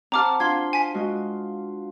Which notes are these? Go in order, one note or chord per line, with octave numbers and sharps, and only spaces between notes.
C4 G4 C5 F#5 A5 A#5 D6 F6
D4 F4 F5 C6 G#6
G#5 B6
G#3 F4 F#4